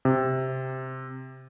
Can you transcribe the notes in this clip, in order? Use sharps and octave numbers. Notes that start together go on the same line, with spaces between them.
C3